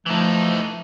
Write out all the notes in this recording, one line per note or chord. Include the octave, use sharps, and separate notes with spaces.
E3 F3 A3 D#4